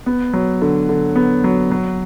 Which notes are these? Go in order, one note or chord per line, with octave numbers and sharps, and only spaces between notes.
B3
F#3
D3
D3
B3
F#3
F#3